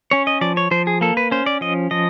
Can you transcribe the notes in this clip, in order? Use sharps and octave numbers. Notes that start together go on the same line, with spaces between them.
C#4 C#5
D#5
F3 D5
C#5
F3 C5
G#4
A#3 A4
B4
C#4 C5
D5
F3 D#5
F3 D#5